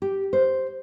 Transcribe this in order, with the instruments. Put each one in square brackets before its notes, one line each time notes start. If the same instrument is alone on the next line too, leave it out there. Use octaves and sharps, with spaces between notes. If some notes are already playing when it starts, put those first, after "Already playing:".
[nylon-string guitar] G4
C5